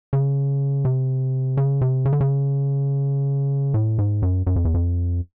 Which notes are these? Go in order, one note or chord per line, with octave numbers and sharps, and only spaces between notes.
C#3
C3
C#3
C3
C#3
D3
C#3
A2
G#2
F#2
F#2
F2
E2
F2